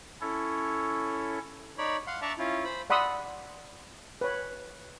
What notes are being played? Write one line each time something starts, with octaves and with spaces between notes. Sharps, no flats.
C#4 E4 A4 C#5
D#4 C#5 D5 B5
F5 F#5 C6
D4 D5 E5 A5 A#5 C#6
C#4 E4 F4
C5 B5
D5 F#5 B5 C6 D#6 E6
B4 C#5